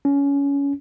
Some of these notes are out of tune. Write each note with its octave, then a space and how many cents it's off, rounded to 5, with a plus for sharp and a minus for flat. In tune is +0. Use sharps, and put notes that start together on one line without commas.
C#4 +20